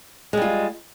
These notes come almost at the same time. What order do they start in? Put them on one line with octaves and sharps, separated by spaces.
G#3 G3 F4